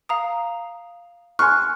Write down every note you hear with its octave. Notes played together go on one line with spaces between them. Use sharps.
F5 A#5 D#6
G#5 C6 C#6 F6 F#6